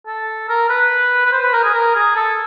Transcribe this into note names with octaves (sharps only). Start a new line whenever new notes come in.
A4
A#4
B4
B4
C5
B4
A#4
G#4
A#4
G#4
A4